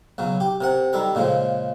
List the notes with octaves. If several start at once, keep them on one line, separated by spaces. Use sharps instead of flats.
B1 C#3 F#3
G4
C3 A#4 F#5
D#3 G3 A4 A#4
A#2 C#3 F3 G#3